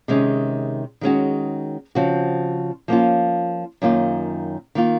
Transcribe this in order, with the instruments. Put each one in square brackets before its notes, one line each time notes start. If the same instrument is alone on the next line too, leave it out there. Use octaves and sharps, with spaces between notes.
[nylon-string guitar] C3 D#3 G#3 C#4
D#3 G#3 C#4 F#4
C#3 F3 C4 F#4
F3 A#3 C#4 F4
F#2 D#3 A#3 F4
D#3 A#3 F4